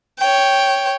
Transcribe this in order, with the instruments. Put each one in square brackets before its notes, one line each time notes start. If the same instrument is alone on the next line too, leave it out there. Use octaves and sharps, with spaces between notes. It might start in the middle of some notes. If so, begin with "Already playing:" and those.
[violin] C#5 G5